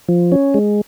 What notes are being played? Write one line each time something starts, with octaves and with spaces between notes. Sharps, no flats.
F3
C#4
G#3